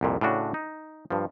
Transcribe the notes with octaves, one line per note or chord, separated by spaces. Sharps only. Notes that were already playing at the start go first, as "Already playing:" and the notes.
C2 F2 A#2
A2 C#3 D4 F#4
D#4
G2 F3